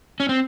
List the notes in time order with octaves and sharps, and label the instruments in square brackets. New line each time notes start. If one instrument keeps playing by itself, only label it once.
[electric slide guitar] C#4
C4